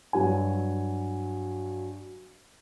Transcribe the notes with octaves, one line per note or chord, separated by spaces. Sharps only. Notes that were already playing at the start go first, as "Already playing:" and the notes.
G2 F#3 F#4 G#5